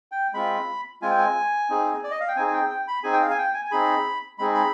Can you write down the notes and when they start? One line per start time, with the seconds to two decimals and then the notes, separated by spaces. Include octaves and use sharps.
0.12 G5
0.34 G#3 C4 F4 B5
1.02 G#3 C4 F4 G#5
1.11 G5
1.18 G#5
1.70 C4 D#4 G#4
2.04 D5
2.11 D#5
2.20 F5
2.28 G5
2.36 C4 D#4 G#4 G#5
2.47 G#5
2.53 G5
2.70 G5
2.88 B5
3.03 C4 D#4 G#4 G#5
3.13 G5
3.21 F5
3.30 G#5
3.38 G5
3.54 G#5
3.65 G#5
3.71 C4 D#4 G#4 B5
4.39 G#3 C4 D#4 G#4 B5
4.54 B5